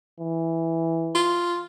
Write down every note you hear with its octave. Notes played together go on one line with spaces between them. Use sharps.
E3
F4